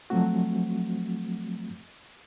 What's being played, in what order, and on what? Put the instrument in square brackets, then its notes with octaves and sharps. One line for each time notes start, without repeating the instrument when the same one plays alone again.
[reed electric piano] F3 F#3 A3 C4 F#4